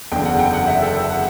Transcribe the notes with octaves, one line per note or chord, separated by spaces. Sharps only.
F#1 E2 D3 G5
F#5
G5
F#5
E5
A4
G5
F#5